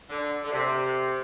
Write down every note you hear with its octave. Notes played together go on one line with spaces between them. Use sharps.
D3
D3
C3